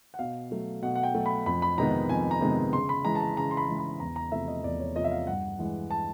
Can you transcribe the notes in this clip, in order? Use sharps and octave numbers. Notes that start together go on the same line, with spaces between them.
F#5
B2 F5
F#3 A3
B2 F#5
F#5
G5
F#3 A3
B5
F2 B5
B5
C3 D#3 G#3 B3 A#5
F2 G#5
A#5
C3 D#3 G#3 B3
C#3 C6
B5
E3 G#3 A#5
A5
A#5
C#3 A#5
C6
B5
E3 G#3
B5
E2 A#5
A#5
C3 F3 A3 E5
D#5
E2 D5
C#5
C3 F3 A3 D#5
E5
F5
G2 F#5
E3 G#3
A5